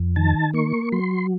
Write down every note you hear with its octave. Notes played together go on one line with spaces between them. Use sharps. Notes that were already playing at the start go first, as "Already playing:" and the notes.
Already playing: F2
D#3 A5
A#3 C#6
F#3 C6